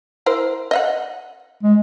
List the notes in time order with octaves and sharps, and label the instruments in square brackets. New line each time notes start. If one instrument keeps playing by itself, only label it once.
[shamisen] E4 A#4 C5
D#5 E5 F#5
[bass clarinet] G#3